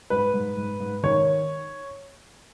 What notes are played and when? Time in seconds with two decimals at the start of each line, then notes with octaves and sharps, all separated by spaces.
0.10 G#2 B4
0.34 G#2
0.57 G#2
0.80 G#2
1.03 D#3 C#5